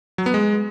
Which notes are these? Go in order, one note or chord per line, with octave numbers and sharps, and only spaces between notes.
F#3
B3
G#3